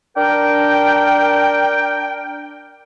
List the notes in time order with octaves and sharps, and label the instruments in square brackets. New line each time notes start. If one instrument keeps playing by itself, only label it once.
[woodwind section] D4 A#4 G5